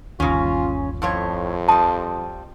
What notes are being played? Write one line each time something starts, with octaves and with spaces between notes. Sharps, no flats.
G1 D#2 C#3 C#4 F4
F2 A2 F3 C#5
F3 G3 A5